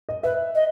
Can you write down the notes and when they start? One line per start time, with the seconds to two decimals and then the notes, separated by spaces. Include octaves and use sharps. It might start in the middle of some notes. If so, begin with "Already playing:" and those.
0.09 D#5
0.23 B4 E5
0.55 D#5